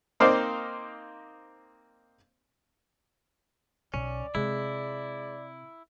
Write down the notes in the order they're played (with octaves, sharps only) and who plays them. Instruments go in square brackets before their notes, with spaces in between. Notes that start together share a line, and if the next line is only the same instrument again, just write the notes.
[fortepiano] A#3 C4 D#4 C5 D5 F5
[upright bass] B1 [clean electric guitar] C#4 [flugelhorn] D5
[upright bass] C3 [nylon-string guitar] G#3 [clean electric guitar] E4